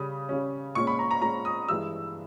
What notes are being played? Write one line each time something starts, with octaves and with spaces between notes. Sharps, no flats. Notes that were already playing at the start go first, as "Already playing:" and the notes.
Already playing: C#3 G3 C#4 D#6
C#3 G3 C#4
A#2 G#3 C#4 C#6
B5
A#5
A#5
A#2 G#3 C#4 A#5
D#6
G2 E3 G#3 E6